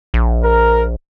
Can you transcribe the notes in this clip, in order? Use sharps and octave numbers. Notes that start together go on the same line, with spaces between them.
A#1
A#4